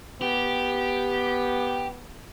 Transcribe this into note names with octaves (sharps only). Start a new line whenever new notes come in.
B3 G4